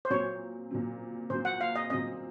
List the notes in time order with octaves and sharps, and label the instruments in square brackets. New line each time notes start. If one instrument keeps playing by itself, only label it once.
[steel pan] C5
[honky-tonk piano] A#2 F#3 C4 [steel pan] C#5
[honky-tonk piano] A#2 F#3 C4
[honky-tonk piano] A#2 F#3 C4 [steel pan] C5
[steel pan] F#5
F5
D#5
[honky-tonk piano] A#2 F#3 C4 [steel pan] D#5